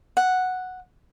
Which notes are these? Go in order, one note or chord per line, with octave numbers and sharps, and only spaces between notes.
F#5